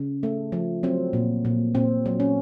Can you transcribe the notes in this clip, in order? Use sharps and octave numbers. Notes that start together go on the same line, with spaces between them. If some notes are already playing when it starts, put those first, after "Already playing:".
Already playing: C#3
A3
F3
F#3 C4
A#2
A#2
A#2 C4
F#3
C#4